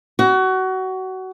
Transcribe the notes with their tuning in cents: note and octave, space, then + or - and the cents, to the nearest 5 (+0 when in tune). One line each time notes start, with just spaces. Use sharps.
F#4 +25